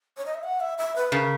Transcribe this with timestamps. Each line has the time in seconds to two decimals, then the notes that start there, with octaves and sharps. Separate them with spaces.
0.17 C#5
0.26 D#5
0.34 E5
0.43 F#5
0.60 E5
0.78 E5
0.96 B4
1.12 C#3 A#4